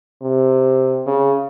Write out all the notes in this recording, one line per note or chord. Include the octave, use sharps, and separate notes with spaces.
C3
C#3